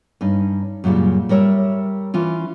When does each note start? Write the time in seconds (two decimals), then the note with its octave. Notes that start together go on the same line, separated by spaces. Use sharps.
0.21 G2 C#4 D#4
0.84 F#2 A#2 C#3 G3
1.29 G3 A#4 C#5 D#5 E5
2.14 E3 C#4 F4